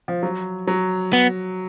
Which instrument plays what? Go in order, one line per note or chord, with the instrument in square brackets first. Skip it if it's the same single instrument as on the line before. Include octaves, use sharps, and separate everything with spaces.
[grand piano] F3
F#3
F#3
[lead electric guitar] B3